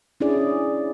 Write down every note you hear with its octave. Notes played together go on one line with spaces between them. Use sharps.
C#4 D4 E4 G#4 D5